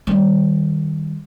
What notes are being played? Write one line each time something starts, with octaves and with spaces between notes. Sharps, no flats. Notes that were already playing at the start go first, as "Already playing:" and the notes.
D#3 G3